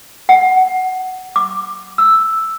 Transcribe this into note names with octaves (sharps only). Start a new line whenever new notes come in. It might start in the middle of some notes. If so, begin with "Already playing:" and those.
F#5
D6
E6